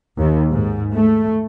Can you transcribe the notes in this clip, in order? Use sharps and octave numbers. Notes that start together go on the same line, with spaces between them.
D#2
G#2
A3